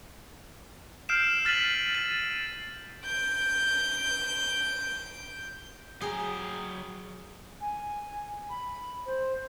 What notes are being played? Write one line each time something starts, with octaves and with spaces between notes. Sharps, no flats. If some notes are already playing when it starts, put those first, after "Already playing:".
E6 F6 G6 C7 D7 E7
F6 A6 B6 D#7 F#7
A6 D#7
G6 D7
F#3 G#4 G5 A#5
G#5
B5
C5